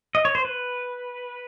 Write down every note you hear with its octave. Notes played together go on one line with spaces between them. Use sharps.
D#5
C#5
C5
B4